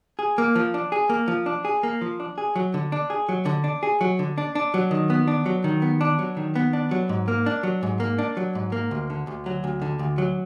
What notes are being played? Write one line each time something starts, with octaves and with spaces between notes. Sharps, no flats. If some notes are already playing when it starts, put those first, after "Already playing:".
G#4
A#3
F3
D4
G#4
A#3
F3
D4
G#4
A#3
F3
D4
G#4
F#3
D3
D4
G#4
F#3
D3
D4
G#4
F#3
D3
D4
D4
F#3
D#3
B3
D4
F#3
D#3
B3
D4
F#3
D#3
B3
D4
F#3
G#2
A#3
D4
F#3
G#2
A#3
D4
F#3
G#2
A#3
D2
D3
D2
F#3
D2
D3
D2
F#3